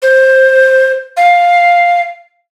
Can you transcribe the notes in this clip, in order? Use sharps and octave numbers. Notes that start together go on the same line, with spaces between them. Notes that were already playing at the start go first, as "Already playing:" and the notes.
C5
F5